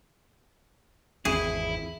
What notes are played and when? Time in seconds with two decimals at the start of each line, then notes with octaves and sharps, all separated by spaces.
1.25 G#1 E2 C4 E4 G#4